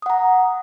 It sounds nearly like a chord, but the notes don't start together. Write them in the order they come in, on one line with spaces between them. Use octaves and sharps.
D#6 F#5 A#5